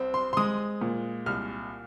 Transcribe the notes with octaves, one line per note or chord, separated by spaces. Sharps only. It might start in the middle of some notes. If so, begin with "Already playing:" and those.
Already playing: C2 C4
C6
C6
G#3 D#6
A#2
C2 F6